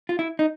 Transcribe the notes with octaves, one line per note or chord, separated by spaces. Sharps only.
F4
E4
D#4